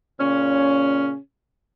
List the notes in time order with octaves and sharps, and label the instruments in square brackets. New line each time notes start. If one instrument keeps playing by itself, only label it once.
[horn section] A#2 C#3 C#4